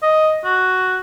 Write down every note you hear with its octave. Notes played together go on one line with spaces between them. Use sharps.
D#5
F#4